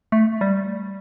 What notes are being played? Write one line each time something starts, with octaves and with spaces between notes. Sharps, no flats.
A3
G3